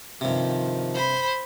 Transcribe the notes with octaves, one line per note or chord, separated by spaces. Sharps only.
G2 C3 D#3 F3
C5 B5